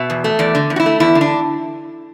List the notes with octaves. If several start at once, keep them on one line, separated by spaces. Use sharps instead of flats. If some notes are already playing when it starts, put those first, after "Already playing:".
Already playing: B2 E5
E2
A3
E2 D5
D3
E2
F#4
E4
A3
E2 E4
D3
D4